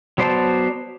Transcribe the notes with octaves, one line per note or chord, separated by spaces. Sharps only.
F#3 B3 C5 D5 A5